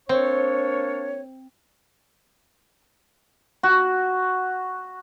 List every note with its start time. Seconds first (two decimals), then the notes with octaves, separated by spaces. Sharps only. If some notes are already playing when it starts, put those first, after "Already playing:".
0.09 A#3 C4 D4 C#5
3.63 F#4